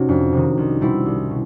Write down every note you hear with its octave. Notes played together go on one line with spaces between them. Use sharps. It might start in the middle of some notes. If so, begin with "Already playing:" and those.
Already playing: C3 C#4 D#4 F#4
F2 D4
C3 D#3
C2
B2 G3 C4 E4
C2
B2